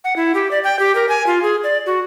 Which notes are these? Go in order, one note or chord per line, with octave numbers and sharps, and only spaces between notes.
F#5
E4
G4
D5
G5
G4
A#4
G#5
F4
G#4
D5
F#4